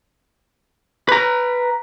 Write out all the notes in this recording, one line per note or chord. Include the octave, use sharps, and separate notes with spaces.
B4 A#5